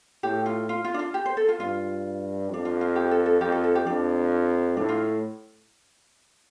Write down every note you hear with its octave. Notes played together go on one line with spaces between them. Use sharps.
A2 G4
F4
F4
F4
D4
F4
G4
C5
A4
F4
G2 F4
F2 D4
F4
F4
G4
A4
A4
F2 G4
A4
A4
G4
F2 D4
A2 D4
F4